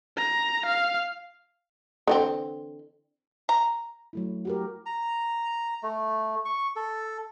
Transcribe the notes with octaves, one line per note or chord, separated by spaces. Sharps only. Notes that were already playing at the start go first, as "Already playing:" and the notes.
A#5
F5
D3 E3 C4
A#5
F#3 A3 E4
F#4 G4 A#4
A#5
A3
C#6
A4